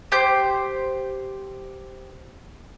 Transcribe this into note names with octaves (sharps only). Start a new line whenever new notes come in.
G4 C5 G6